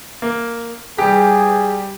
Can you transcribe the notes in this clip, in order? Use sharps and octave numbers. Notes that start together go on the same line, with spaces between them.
A#3
G3 G4 G#4